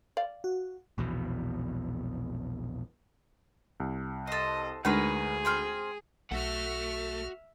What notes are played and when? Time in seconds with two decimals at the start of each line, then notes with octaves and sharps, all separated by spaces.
0.17 D5 F5
0.44 F#4
0.98 A#1 E2 B2
3.80 C2
4.27 A4 C5 D#5
4.85 D2 G#3 D4 D#4 G#4 A#4 B4 C#5
5.45 C4 G5 F6
6.31 B1 A3 F#4 E5 F#5 F6